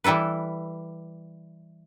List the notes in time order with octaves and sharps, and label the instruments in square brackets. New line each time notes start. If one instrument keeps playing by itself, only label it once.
[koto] E3 G3 E4 A4 B4